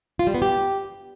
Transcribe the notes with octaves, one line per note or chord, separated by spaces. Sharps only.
F4
G3
B3
G4